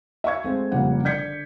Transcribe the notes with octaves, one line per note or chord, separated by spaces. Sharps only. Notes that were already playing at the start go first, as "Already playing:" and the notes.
E5 F5 C#6 G#6
G#3 A3 C4
F1 A#2 C#3 G3 F#5
D3 D5 G6 G#6 B6 C#7